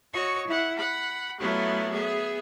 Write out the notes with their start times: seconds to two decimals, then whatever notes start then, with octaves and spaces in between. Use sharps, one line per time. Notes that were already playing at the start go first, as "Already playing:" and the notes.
0.14 F#4 C#5 D#5 C#6 E6
0.47 E4 F#5
0.76 F#5 B5
1.40 F#3 A3 B3 E4 F4
1.91 B3 G#4 E5